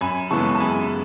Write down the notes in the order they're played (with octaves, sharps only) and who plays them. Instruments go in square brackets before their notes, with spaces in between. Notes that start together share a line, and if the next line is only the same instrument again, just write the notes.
[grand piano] F#2 G#5 B5
C#3 E3 G#3 B3 A5 C#6
A5
F#2 G#5 B5